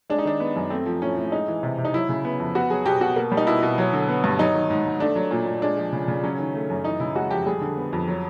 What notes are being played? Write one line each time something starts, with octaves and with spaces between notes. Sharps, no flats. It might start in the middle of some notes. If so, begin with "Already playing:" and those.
G#3 D4
D#4
D#3 D4
B3
F#2
A3 C4
F3
A2 C#4
A2
G#3 D#4
E3
C3
C3
D#4
F#3 E4
C#3
B3
F2
B3 F#4
F#3 G#4
B2 G4
B2 F#4
A#3
G3
D#4
B2 E4
B2
F#3
D3
B3
G2
F#3 D#4
D#3
G#2
G#2
A3 D4
F#3
A#2
A#2
G#3 D4
F3
C#3
C#3
F#3 C#4
D#3
A3
F#2
E3 D#4
C#3 E4
G#3 F#4
F2 G4
G3 G#4
D3
B3
F2
F#3